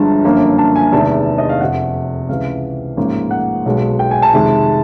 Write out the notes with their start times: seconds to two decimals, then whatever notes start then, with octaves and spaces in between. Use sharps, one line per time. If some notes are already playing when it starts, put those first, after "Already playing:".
Already playing: G1 G2 D3 F3 G#3 A5
0.24 G1 F#2 D3 F3 A#3
0.58 A5
0.76 G#5
0.92 E2 C3 D#3 G#3 A5
1.38 D#5
1.49 F5
1.61 F1 F2 C3 F#5
2.29 C#2 C3 E3 F5
2.97 A1 G#2 F3 A#3
3.31 F#5
3.66 B1 B2 G#3
3.99 G5
4.11 G#5
4.22 A5
4.34 F2 C3 D#3 G#3